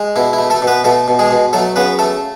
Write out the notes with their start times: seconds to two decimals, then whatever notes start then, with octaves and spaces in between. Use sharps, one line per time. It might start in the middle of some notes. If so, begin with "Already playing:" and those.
Already playing: G#3
0.16 B2 E4
0.33 E4
0.39 A3
0.50 A3 A4
0.62 B2
0.67 B3 B4
0.84 B2 A3 A4
1.08 B2
1.19 G#3 G#4
1.31 B2
1.53 F#3 A3 A4
1.76 C#3 B3 B4
1.99 A3 A4